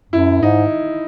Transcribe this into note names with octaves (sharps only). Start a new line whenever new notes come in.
F#2 E4
G#2 D#4